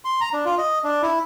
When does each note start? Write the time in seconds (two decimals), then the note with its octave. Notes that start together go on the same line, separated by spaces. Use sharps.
0.05 C6
0.21 A#5
0.33 D4
0.45 F4
0.58 D#5
0.84 D4
1.02 E4